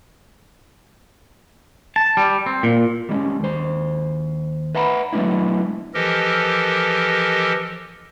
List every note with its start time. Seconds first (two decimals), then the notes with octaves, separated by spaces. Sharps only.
1.96 A5
2.17 G3
2.46 C4
2.63 A#2
3.09 G3 G#3 A#3 C#4
3.40 D#2 C5
4.75 B4 E5 F#5 A#5 B5
5.13 F#3 G#3 A3 B3 D4 E4
5.94 E3 F3 G4 A4 A#4 D#5